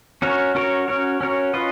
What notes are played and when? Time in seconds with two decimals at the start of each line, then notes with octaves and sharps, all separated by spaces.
0.22 C#4 F#4 A#4 C#5
0.55 C#4 F#4 A#4 C#5
0.88 C#4 F#4 A#4 C#5
1.21 C#4 F#4 A#4 C#5
1.54 C#4 F4 B4 D#5